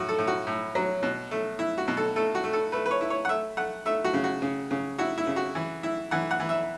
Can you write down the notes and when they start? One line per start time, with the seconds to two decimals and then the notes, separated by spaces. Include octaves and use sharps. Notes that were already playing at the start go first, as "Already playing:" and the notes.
Already playing: A2 F#4
0.09 A4
0.18 A2
0.27 F#4
0.47 A2
0.75 F#3
1.02 B2
1.31 A3
1.59 E4
1.78 F#4
1.88 B2
1.97 A4
2.16 A3 A4
2.35 F#4
2.44 A3
2.53 A4
2.72 A3 B4
2.86 B4
2.91 C#5
3.01 E4
3.10 C#5
3.25 F#5
3.29 A3 E5
3.57 A3 F#5
3.86 A3 E5
4.04 F#4
4.14 C#3
4.24 F#4
4.42 C#3
4.71 C#3
4.98 E4 F#4
5.18 E4
5.27 C#3
5.36 F#4
5.55 E3
5.83 E4
6.11 E3 F#5
6.31 F#5
6.40 E3
6.49 E5